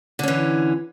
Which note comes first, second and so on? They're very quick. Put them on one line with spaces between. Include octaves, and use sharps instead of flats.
D3 C#4 E3